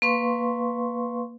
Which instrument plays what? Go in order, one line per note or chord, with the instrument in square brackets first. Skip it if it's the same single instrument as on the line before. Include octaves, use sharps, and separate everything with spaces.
[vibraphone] A#3 B4 F5 C6 C#6